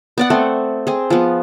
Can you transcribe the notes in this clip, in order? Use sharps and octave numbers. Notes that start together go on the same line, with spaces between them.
B3 D5 F#5
A3 C4
C4 G#4
F3 B3